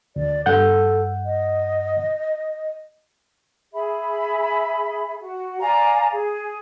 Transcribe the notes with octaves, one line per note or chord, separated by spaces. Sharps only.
D2 D5
G2 A4 F#5 G6
D#5
G#4 E5 B5
F#4
D5 F5 G#5 A#5
G#4